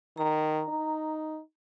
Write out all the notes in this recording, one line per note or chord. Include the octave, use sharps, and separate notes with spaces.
D#3 A#5
D#4